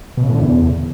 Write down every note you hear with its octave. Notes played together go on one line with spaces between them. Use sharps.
B2
C#3
A2
D3
E2